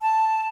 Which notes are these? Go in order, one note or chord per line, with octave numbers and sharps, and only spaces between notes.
A5